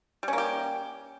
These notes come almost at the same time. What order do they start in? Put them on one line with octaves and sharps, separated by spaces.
G3 C#4 A#3 G4